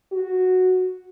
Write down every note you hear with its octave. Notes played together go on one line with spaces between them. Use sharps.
F#4